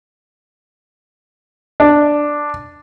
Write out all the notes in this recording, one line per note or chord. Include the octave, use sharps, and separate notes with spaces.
D4